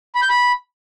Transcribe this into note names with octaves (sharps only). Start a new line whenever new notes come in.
B5
G6
B5